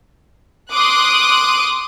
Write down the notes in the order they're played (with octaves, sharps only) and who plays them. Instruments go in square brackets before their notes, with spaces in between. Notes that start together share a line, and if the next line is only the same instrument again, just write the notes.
[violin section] C6 D6 D#6 F#6